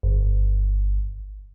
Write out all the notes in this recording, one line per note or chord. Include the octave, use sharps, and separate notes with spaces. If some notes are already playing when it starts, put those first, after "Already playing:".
G1